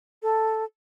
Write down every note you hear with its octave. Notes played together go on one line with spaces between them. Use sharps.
A4